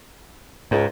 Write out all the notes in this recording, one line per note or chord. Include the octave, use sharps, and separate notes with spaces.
C#2 G#2